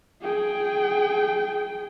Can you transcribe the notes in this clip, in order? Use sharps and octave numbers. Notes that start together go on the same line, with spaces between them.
G#4 G5